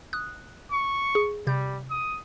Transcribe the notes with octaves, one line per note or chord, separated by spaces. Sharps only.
D#6 F#6
C#6
G#4
C3 G3 G6
D#6